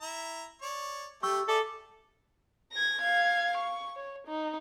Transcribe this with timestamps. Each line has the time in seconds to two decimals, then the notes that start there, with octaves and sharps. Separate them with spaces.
0.02 E4 A#5
0.62 C#5 D5
1.23 A3 G4 G5 C#6 E6
1.48 G#4 A4 D5 E5 D6
2.72 G#6 A#6
3.02 F5 G#6
3.57 C#6
3.96 C#5
4.27 D#4